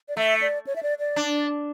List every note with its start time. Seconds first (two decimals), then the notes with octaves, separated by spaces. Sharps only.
0.08 D5
0.17 A3 E5
0.42 D5
0.67 C#5
0.76 E5
0.83 D5
0.99 D5
1.16 D4